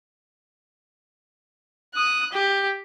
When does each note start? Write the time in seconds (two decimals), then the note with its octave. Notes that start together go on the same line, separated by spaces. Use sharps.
1.94 D#6 F#6
2.32 G4